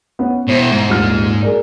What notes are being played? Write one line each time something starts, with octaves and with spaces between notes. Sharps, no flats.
B3 C#4
B2 E4 C5
G#2
D#1 A#2 F6
G#4 A#4 D5